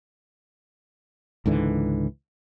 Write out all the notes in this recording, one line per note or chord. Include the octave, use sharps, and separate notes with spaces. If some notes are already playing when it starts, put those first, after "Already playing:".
C#2 G#2 D3 E3